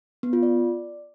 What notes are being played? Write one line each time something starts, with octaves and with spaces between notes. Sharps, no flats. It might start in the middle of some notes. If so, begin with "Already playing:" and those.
B3
F4
D5